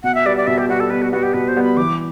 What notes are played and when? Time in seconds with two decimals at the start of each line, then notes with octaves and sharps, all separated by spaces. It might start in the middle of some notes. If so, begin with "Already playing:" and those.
0.04 B2 F#5
0.15 E5
0.25 G3 B3 D5
0.37 D5
0.47 B2 E5
0.58 G4
0.68 G3 B3 F#4
0.80 A4
0.90 B2 B4
1.02 F#4
1.12 G3 B3 F#4
1.23 G4
1.34 B2 B4
1.48 C5
1.56 G3 B3
1.63 B5
1.77 E3 D6